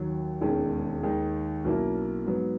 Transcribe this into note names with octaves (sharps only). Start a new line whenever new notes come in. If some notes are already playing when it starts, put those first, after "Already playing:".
Already playing: D#2 D#3 F#3
E1 D#2 D#3 G#3 C#4
D#2 D#3 G#3 D#4
B1 B2 A#3 C#4 E4
G#2 F#3 B3